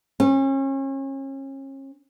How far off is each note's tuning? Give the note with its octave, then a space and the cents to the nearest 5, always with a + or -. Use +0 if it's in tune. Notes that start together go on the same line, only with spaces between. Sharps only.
C#4 -35